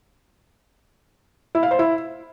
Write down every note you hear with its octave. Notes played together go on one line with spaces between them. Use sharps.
E4
F5
C5
E4